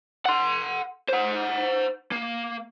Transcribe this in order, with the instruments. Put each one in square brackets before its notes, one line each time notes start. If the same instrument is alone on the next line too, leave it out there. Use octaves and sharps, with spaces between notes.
[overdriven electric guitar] F#5 C6
C5 F#5
A#3